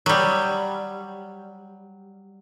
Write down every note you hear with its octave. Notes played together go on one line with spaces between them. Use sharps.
F#3 G3